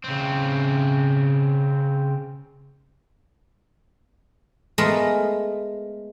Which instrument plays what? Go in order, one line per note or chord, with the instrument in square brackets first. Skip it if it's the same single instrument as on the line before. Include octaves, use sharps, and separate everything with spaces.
[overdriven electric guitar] C#3 C4
[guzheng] G#3 A3 B3 A#4